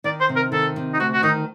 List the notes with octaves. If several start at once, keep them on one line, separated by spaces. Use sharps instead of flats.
D#3 D5
C5
C3
A#4
D#3 A4
C3
D#4
D2 F#4
F#4
D#3 D#4